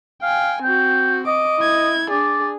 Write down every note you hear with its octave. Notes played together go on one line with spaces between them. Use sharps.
F5 G5 G#5
C4 F#4 G5
D#5 D6
E4 G#6
D4 G#4 D5